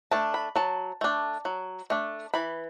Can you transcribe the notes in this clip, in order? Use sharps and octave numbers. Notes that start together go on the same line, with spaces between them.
A3 D4 A5
B5
F#3 A5
A3 D4
F#3
A3 D4
E3 B5